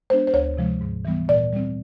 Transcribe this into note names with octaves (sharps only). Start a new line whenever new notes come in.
G#3 B3 D4 C5
C5
D2 C#5
C3 F3 G#3
G#2
E3 G3 B3
A#2 D5
G3 C4